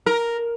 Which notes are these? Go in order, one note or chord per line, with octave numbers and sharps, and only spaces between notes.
A#4